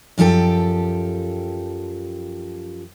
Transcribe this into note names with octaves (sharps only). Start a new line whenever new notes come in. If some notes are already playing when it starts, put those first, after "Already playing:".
F#2 F3 G4 A4 G5